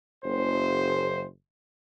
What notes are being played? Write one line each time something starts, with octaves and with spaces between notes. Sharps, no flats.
F#1 C5